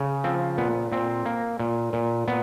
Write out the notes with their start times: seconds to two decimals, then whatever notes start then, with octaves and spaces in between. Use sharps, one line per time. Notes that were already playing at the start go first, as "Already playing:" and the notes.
Already playing: C#3
0.24 F3 C4
0.58 A#2 B3
0.92 A#2 C4
1.26 A#3
1.59 A#2
1.93 A#2
2.28 A#2 B3